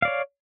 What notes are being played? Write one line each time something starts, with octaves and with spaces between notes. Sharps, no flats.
C#5 D5 F5